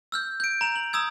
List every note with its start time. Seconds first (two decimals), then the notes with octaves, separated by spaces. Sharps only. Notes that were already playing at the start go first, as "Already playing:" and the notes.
0.12 E6 F6 G6
0.40 G6 D7
0.61 A#5 F7
0.76 F#7
0.93 A#5 D#6 E6 G#6